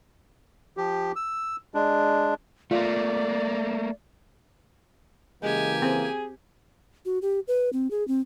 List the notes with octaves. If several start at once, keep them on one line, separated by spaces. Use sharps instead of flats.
F3 G4
E6
G#3 D4
A3 A#3 F4 D5
C#3 E3 G#3 A#3 G4 G#5
C4 G#4
F#4
G4
B4
C4
G#4
C4